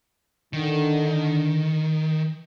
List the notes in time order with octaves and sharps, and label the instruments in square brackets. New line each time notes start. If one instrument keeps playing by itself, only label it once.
[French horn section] D3 [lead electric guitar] D#3